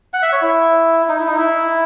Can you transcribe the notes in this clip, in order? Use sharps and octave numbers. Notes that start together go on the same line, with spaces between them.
F#5
E5
C#5
E4
D#4
E4
D#4
E4